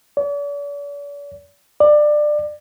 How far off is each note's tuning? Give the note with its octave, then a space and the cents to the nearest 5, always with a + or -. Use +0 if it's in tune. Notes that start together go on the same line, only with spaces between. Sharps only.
D5 -45
D5 +20